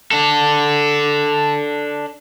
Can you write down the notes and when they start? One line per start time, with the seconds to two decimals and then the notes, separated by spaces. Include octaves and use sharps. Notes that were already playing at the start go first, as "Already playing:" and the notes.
0.11 D4 A4